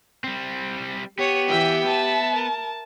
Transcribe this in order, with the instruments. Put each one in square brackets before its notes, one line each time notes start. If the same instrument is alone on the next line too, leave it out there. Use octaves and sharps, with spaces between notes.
[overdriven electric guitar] G3 C4
[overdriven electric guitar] B3 [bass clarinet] G4 [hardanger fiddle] C#5
[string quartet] E3 [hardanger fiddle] E5 G5
[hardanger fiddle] E5 [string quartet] A5
[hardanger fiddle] A#4